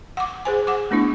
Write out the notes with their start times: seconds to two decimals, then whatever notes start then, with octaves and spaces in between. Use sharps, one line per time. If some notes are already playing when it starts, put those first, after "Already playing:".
0.17 F#5 D6
0.45 G#4 C5 G#5
0.67 F#5 D6
0.91 A3 B3 D4 E4